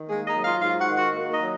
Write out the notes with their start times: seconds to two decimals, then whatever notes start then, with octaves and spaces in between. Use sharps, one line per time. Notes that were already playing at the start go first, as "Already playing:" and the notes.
Already playing: D#3
0.08 G#3 A#3 G#4
0.26 D#4 D#5
0.35 F#3
0.44 F4 F5
0.61 G#2 F4 F5
0.79 F#4 F#5
0.88 D#3
0.96 F#4 F#5
1.14 A#3
1.32 D#4 D#5
1.41 F#3